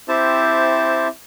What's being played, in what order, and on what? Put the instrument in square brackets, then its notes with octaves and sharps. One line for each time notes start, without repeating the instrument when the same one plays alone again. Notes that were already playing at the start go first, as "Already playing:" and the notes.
[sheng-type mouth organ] C4 E4 G4 C5 E5 A5